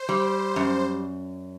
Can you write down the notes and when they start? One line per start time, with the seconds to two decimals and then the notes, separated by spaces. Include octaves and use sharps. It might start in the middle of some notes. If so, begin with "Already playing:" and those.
Already playing: C5
0.09 G3
0.56 F#2